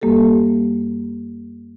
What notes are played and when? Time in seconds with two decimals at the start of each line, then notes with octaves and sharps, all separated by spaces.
0.02 F#2 G3 A#3 G4 A4